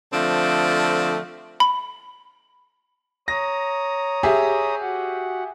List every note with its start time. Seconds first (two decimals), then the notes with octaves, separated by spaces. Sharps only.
0.13 D3 F3 A3 C4
1.60 B5
3.28 C#5 A#5 D#6 A#6
4.23 G4 G#4 E5
4.81 F#4 F#5